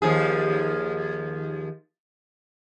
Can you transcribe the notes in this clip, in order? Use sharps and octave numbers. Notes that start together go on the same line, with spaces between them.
D#2 F3 G#4